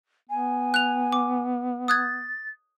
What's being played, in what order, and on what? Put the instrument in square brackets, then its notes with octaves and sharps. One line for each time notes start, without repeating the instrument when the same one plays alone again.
[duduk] B3 [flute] G#5
[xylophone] F#6 F7
D6
[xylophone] D#6 F#6 G#6 [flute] A6